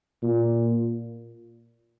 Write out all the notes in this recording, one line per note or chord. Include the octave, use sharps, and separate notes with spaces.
A#2